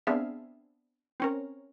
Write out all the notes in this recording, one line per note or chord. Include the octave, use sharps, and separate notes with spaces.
B3 C4 D4 G#4 E5 F5
C4 C#4 A#4